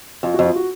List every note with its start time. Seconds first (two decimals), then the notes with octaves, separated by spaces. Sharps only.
0.23 F2 F4
0.34 F2 F#4
0.44 F4
0.56 F#4